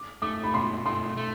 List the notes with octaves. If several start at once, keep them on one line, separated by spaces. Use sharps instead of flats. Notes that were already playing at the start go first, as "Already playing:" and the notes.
Already playing: D6
A3 D6
B5
B2 C6
A3 C6
A3